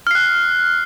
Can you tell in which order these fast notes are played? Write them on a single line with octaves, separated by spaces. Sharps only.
F6 C7 F#6